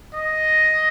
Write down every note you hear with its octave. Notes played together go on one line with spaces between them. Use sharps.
D#5